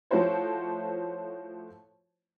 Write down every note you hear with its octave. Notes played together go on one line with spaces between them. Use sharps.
F3 A3 E4 F#4 C5 C#5